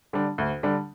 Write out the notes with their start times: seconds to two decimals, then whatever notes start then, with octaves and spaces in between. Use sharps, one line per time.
0.13 D3 G3 D4
0.38 D2
0.63 D3 G3 D4